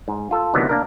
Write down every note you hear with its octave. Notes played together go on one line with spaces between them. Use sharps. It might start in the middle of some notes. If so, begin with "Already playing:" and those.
G#2
F4 A4
D2 C3 D#3 E3 F#3 B3
A#3 D4 A#4